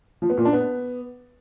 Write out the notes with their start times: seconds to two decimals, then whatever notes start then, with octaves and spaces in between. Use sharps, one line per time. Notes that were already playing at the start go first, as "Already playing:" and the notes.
0.22 F3
0.30 B3
0.37 A#2
0.45 D4
0.53 B3